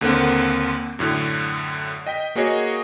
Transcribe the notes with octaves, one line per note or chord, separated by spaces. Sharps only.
D#2 D3 A#3 C4 F#5
F#2 A2 D3
D#5 G5 B6
A#3 F#4 G#4 C#5 D#5